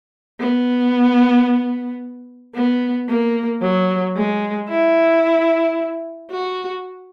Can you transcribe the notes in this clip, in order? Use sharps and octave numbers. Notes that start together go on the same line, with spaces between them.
B3
B3
A#3
F#3
G#3
E4
F#4